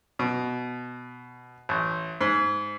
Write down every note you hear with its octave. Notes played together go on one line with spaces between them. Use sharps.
B2
A1
G#2